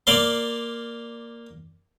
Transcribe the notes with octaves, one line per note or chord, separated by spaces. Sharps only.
A#3 D5 F5 C6